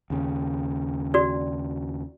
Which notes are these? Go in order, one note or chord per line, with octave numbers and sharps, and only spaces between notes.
D#2 C#3
F#4 D5